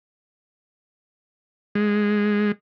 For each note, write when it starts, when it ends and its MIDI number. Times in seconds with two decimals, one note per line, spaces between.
1.75 2.52 56